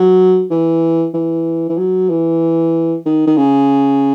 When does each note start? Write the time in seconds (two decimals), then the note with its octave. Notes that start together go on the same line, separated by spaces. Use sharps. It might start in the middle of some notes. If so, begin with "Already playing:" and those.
Already playing: F#3
0.50 E3
1.14 E3
1.69 E3
1.78 F#3
2.10 E3
3.05 D#3
3.27 D#3
3.37 C#3